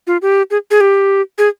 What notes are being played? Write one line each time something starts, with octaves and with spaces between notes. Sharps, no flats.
F4
G4
G#4
G#4
G4
G#4